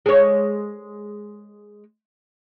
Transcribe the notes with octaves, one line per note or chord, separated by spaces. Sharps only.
G#3 C#5